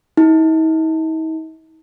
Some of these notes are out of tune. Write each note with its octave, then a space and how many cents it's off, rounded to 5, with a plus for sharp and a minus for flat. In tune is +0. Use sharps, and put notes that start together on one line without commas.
D#4 +45